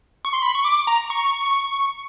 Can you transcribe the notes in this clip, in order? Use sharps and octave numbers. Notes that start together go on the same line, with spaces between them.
C#6
C6
B5
C#6
D6
A#5
C#6